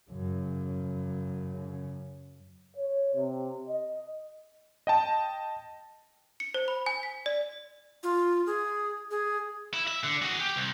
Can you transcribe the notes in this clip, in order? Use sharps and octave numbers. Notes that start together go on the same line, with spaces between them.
F#2 C#3
C#5
C3
D#5
D#5 G5 A5
C#7
C5
B5
G#5
B6
D5
F4
G#4
G#4
E4
E5
D3
F#4 G#4
G4
C2